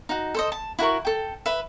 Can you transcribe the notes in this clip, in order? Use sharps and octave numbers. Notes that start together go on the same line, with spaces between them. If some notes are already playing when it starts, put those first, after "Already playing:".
D#4 F#4
A4 C5 D#5
A5
E4 F#4 A#4 C#6
A4 G5
B4 E5